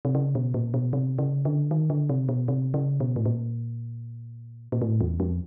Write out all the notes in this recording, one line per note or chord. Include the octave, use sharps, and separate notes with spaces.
C3
C#3
B2
A#2
B2
C3
C#3
D3
D#3
D3
C3
B2
C3
C#3
B2
A2
A#2
A#2
A2
E2
F2